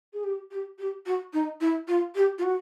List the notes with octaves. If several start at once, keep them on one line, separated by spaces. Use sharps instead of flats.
G#4
G4
G4
G4
F#4
D#4
E4
F4
G4
F4
F#4